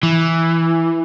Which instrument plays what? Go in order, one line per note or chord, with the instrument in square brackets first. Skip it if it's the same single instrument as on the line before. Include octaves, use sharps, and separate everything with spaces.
[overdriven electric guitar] E3